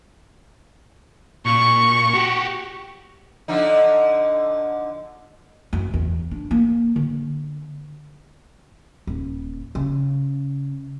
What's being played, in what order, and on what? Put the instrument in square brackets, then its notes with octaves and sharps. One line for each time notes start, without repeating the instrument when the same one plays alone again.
[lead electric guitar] A#2 [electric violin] C#6
[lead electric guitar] F#4 G4
[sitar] D3 F3 D#4
[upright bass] F#2
E2
D4
A#3
D3
D#1
C#3